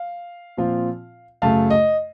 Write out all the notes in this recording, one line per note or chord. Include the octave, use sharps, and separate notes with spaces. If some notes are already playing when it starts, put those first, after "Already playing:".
Already playing: F5
A#2 F3 C4 F4
F#2 C#3 A3 F5 A5
D#5